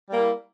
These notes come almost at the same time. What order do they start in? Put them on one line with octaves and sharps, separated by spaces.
G3 A#3 E4